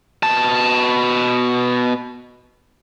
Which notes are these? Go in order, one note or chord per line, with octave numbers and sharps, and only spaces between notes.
B2 A5